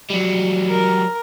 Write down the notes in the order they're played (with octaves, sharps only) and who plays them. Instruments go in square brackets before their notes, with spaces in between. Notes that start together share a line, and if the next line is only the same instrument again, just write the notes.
[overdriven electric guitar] F#3 G3
[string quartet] A#4